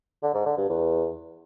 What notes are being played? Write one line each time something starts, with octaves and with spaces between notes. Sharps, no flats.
D3
G#2
D3
G2
E2